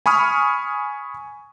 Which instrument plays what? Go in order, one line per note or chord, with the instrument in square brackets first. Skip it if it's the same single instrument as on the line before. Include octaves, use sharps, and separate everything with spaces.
[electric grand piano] G#5 B5 C#6 D#6 F6